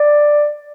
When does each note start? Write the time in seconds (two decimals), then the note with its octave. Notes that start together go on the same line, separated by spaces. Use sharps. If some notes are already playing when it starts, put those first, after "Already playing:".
Already playing: D5